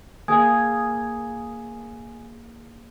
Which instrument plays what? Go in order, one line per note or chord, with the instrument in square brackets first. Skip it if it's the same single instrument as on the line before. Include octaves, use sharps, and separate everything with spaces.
[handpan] A#3 G#4 [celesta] G#5 D#6 G#6